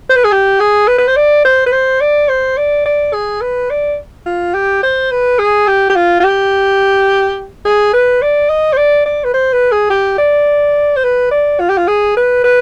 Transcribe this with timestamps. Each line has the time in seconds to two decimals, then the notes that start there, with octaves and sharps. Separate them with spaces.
0.10 C5
0.16 B4
0.24 G#4
0.32 G4
0.60 G#4
0.88 B4
0.98 B4
1.08 C5
1.16 D5
1.45 C5
1.66 B4
1.72 C5
2.01 D5
2.29 C5
2.57 D5
2.86 D5
3.13 G#4
3.41 B4
3.70 D5
4.26 F4
4.54 G4
4.83 C5
5.11 B4
5.39 G#4
5.68 G4
5.90 G4
5.96 F4
6.20 F4
6.24 G4
7.65 G#4
7.93 B4
8.22 D5
8.49 D#5
8.73 C5
8.77 D5
9.06 D5
9.24 B4
9.34 C5
9.53 B4
9.72 G#4
9.90 G4
10.18 D5
10.96 C5
11.04 B4
11.31 D5
11.60 F4
11.69 G4
11.78 F4
11.87 G#4
12.17 B4
12.44 B4